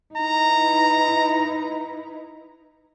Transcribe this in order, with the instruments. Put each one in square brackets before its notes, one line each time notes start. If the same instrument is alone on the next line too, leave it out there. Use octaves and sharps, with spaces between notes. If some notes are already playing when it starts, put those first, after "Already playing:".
[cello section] D#4 E4 B4 [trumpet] A#5